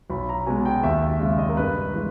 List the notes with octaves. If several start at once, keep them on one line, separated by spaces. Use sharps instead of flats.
B1 B5
A#5
B2 G#3 G#5
G5
D#2 E5
E5
C#3 G#3 E5
D#5
A#4
G2 B4
E3 G#3